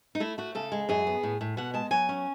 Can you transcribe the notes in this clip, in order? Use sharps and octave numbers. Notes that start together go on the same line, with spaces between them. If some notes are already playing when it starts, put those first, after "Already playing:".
D#4
A3 E4
A3 F#4
C#3 A4
G#3
F#2 G#4
B3
A2
A2
B2 F#5
G#3 A5
F#3 G#5
C#4